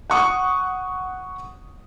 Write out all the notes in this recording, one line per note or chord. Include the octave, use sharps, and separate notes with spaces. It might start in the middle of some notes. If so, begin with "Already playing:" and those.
F#5 C#6 D#6